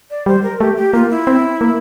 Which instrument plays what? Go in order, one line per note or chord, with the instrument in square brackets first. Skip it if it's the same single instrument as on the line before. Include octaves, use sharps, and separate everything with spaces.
[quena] D5
[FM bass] G3 [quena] C5
[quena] A#4
[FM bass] A3 [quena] G4
[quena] G4
[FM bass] A#3 [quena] F4
[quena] E4
[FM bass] C4
A#3